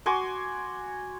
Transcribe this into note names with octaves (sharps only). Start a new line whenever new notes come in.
F#4 G#5 C6 D6